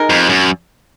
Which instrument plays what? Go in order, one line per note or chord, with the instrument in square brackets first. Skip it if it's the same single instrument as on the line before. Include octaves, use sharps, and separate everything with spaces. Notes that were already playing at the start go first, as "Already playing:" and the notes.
Already playing: [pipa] G#3 D#4 A#4
[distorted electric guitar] F2
F#2